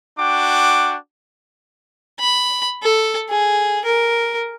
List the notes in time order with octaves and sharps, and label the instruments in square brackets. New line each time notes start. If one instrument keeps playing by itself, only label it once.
[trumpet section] D4 F#4 G5 D6
[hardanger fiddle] B5
A4
G#4
A#4